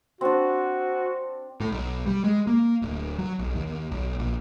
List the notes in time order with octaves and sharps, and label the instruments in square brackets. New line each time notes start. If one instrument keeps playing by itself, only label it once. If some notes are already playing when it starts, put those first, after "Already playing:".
[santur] C4 D4 [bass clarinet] F#4
[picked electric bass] A2
B1
G3
G#3
A#3
D1
F#3
B1
D#2
B1
A#1